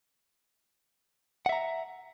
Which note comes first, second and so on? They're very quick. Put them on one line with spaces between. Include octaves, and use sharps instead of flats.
F#5 E5 A#5